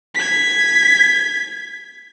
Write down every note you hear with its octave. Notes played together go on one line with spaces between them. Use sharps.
G#6 B6